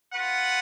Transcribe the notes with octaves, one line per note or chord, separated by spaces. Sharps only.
F4 B4 F#5